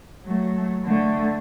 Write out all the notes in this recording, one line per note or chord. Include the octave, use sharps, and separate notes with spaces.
F#3 A3
D3 A3